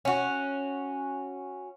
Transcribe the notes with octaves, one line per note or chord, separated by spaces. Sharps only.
C#4 F#4